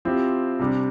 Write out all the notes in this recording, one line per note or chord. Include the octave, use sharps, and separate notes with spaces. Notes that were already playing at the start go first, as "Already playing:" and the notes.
F3 C4 E4 G4
C3 G3 D4